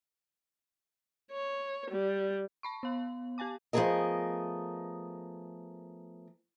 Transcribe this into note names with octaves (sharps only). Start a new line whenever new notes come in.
C#5
G3
A5 B5 C#6
B3 F5
G4 F5 G#5 A5 D6
F3 A3 B3 G#4 A#4 D#5